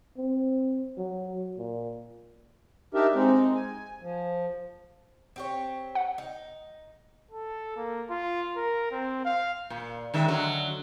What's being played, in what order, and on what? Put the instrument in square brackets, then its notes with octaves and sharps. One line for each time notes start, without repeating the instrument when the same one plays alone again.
[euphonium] C4
F#3
A#2
[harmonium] D4 D#4 G4 A#4 E5
G#3 C4 D#4
G#5
F3
[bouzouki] C4 G4 C#5
[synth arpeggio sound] F#5
[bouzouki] D#4
[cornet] A4
A#3
F4
A#4
C4
F5
[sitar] A#2
D#3 G#3 E5
D3 F#3